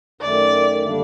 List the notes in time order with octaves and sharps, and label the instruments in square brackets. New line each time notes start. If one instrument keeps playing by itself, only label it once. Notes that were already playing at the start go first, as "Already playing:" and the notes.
[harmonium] F#2 D#3 A3 [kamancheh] D5
[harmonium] D3 G3 A#3 D4